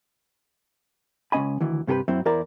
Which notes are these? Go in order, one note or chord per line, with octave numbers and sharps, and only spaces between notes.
C#2 F#3 C#4 D#5 G#5 B5
D2 D#3 E3
G2 C3 G4 A#4 B4
F#2 F#3 C4 E4
E2 E4 A#4 C5 D5 A#5